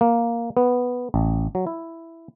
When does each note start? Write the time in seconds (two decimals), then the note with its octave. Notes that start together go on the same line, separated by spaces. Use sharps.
0.01 A#3
0.57 B3
1.14 A1
1.55 F#3
1.67 E4